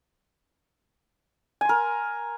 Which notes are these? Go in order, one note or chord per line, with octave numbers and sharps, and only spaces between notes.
A#4 G#5 C6